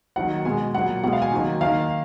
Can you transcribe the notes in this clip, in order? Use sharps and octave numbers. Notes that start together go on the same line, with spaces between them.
D#3 F#3 A#3 F#5
B2 G#3 G#5
A#2 F#3 A#3 F#5
B2 G#3 F#5
F5
G#5
D#3 F#3 A#3
D#3 A#3 F5